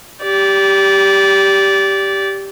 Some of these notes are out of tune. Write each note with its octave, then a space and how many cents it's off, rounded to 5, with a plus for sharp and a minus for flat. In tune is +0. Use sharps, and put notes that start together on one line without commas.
G4 +0 D5 -20